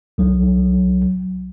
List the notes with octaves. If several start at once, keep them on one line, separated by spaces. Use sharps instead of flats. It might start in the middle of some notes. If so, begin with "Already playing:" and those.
C2 F#3